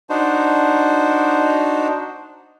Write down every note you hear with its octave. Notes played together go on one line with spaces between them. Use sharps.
D4 D#4 F#4 C5